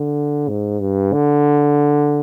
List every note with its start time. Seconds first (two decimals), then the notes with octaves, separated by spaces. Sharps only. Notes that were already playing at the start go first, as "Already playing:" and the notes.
Already playing: D3
0.48 G#2
0.80 G2
1.13 D3